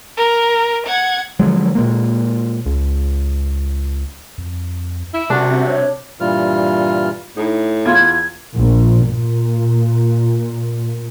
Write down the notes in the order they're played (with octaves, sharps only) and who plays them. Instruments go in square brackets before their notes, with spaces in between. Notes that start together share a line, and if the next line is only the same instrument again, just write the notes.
[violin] A#4
F#5 G#6
[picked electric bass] D3 F3 F#3 G#3
A#2 G#3 A#3
C#2
[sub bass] F2
[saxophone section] E4
[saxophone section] F#2 G3 F#4 [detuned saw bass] C3 [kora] D4
[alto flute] C#5
[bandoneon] G2 A#2 E3 G3 F4 F6
[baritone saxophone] A2 [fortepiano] D#4
[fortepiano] E2 F4 [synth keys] G#6
[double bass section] A#1
A#2